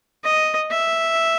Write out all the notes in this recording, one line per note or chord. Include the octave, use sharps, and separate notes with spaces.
D#5
E5